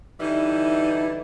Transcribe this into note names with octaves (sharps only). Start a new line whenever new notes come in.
D3 E3 G3 D#4 E4